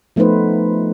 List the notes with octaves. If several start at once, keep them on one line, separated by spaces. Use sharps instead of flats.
F3 A3 B3 D#4 B4 C5